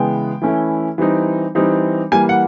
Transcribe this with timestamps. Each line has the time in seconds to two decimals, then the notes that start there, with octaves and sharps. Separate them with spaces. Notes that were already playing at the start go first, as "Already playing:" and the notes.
Already playing: C#3 E3 G#3 B3 G5
0.42 E3 A3 C#4 E4
0.98 E3 G3 C4 D#4
1.55 E3 G3 C4 D#4
2.12 E3 G3 A#3 G#5
2.29 F#5